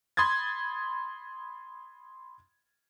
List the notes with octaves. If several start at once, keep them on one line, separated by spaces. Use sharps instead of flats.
B5 C6 D#6 G#6 A6